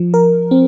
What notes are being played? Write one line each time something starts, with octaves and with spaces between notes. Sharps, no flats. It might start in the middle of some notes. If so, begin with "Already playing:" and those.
Already playing: F3
A#4
C4